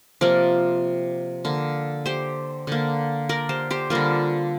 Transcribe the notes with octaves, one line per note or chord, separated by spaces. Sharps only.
C3 F3 A#3 A#4 D5
D3 A#3
G4 C5
D3 A#3
A#4 D5
G4 C5
G4 C5
D3 G3 A#3 F4 A#4